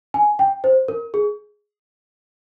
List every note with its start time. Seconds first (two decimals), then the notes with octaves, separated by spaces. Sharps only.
0.14 G#5
0.39 G5
0.64 C5
0.88 A#4
1.14 G#4